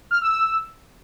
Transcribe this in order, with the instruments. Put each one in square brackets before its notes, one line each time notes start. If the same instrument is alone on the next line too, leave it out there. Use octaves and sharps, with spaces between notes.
[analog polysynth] F6
E6
E6